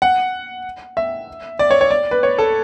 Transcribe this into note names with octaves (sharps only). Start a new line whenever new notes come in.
F#5
E5
D5
C#5
C#5
D5
B4
C#5
A4